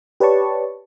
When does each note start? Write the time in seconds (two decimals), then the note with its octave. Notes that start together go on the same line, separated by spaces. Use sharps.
0.20 G4 B4 C#5 D5 A5 C#6